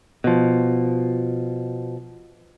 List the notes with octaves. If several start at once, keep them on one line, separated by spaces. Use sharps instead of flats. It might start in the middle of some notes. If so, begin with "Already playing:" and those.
B2 F3